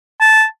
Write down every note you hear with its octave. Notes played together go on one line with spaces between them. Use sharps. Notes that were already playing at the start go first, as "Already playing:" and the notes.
A5